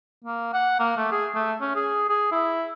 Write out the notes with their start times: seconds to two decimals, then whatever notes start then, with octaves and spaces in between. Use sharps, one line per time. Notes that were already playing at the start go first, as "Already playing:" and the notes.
0.24 A#3
0.53 F#5
0.79 A#3
0.97 A3
1.12 G#4
1.35 A3
1.61 C#4
1.76 G#4
2.09 G#4
2.32 E4